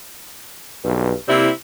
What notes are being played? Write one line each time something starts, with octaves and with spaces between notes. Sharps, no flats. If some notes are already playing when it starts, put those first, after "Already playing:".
B1 G2
C3 G3 A#3 C4 E4